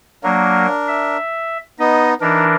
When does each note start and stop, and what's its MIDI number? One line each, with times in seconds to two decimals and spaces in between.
0.24 0.67 54
0.24 0.67 58
0.24 1.17 62
0.24 1.17 70
0.88 1.58 76
1.79 2.14 59
1.79 2.14 63
1.79 2.09 75
2.21 2.56 52
2.21 2.56 62
2.21 2.45 63
2.21 2.56 70